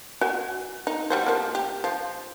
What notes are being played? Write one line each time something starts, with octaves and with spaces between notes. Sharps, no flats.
F#4 G#5
D#4
G3 F#4 C5
F3 A#3
G4
F3